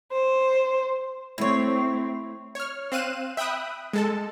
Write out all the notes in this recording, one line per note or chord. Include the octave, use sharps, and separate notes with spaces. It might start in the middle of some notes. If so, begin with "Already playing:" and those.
C5
A3 C4 E4 C#5
C#5 F6
C4 F5 F#6 D#7 E7
E5 G5 B5 D#6 F#6
G#3 A4 A5